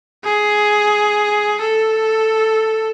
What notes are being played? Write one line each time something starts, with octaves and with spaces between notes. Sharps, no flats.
G#4
A4